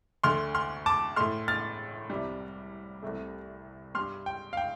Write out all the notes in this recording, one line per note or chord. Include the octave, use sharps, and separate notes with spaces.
D2 D3 A3 C6 F6
C6 F6
A5 D6
A2 A3 C6 F6
F6 A6
C2 C3 G3
C2 C3 A3
G2 G3 C6 F6
G5
F5
G5